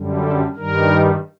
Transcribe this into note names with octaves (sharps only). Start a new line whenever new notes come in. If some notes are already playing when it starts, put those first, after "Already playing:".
Already playing: F#2 D3 G3
A4
G2 D#3 G3 A#4